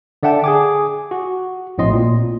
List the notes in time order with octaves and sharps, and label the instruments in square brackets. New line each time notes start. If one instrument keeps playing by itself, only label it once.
[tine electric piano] D3 D5 E5 F#5 G5 A5
G#4 G#5 D6
F#4
A#1 A2 C4 D#5 C6
A#2